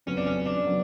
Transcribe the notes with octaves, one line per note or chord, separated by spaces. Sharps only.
F2 C#3 F#3 B3 C#4
D4
C#4
D4
C#3 F#3 B3